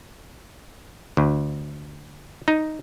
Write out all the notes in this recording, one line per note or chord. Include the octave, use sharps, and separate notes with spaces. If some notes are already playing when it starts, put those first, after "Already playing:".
D2
D#4